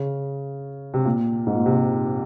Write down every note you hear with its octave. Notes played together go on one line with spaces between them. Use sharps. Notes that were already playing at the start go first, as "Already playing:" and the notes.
Already playing: C#3
C3
A#2
G#2
A#2
C3